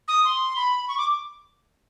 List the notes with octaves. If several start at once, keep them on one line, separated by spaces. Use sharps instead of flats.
D#6
C6
B5
C#6
D6